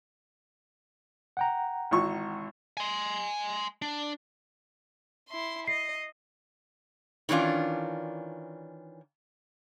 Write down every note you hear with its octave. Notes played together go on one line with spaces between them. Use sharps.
F#5 G5 A#5
G#1 E3 C#6
G#5 C6
D4
E4 C6
D#5 C7
D#3 E3 C#4 D4 F4